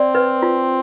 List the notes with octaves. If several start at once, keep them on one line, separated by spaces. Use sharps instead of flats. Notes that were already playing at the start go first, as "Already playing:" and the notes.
Already playing: C4 D5
B4
F4